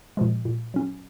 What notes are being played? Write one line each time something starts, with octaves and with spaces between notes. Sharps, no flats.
A#2 F3 G#3
A#2
F#3 C#4